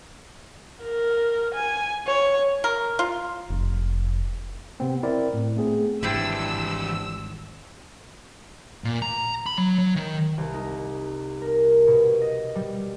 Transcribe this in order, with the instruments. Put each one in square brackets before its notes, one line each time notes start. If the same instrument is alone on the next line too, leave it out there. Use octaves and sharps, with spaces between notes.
[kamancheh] A#4
G#5
C#5
[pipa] A#4
F4
[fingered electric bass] F1
[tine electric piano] C3 B3 C4
C4 E4 A#4 D5
A2
A3 B3 C4 G#4
[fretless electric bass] G#1 [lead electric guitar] E3 G3 [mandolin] C4 D4 E4 [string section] E6
[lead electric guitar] A#2
A#5
B5
F#3
F#3
D#3
[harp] C2
D#4
A#4
B2
D#5
G3